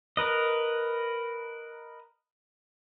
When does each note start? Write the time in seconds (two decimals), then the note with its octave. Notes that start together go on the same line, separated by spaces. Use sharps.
0.17 A#4 B4 D#5